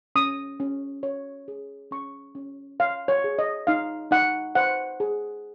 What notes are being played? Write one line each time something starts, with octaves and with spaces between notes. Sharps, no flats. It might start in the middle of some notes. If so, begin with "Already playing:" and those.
C#4 D#6
C#4
C#5
G#4
C#4 C#6
C#4
C#5 F5
C#5
G#4
D#5
D#4 F5
D#4 F#5
C5 F#5
G#4